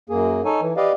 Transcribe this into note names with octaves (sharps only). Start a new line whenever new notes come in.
F#2 A#3 G#4
D#4 A4 C#5 G#5
E3
G4 B4 D5 D#5 F5